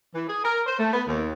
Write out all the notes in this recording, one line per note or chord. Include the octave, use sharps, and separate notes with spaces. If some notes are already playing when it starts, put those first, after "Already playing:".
E3
G#4
A#4
C5
A3
B3
D#2